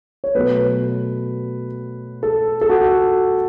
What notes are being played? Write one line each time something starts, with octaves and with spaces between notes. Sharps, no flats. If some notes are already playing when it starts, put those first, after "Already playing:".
C#5
B2 F#3 A3 B4
A4
A4
F#4